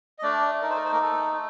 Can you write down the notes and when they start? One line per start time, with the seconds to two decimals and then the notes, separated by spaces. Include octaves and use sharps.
0.19 D#5
0.23 A3 D4 D5
0.62 D#4 A#4
0.70 C5
0.77 A#4
0.85 C5
0.92 A#3 A#4
1.02 A3 A4